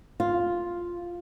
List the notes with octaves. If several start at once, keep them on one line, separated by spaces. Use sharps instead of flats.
F4